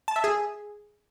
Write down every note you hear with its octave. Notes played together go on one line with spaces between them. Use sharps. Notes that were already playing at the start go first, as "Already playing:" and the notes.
A5
E5
G#4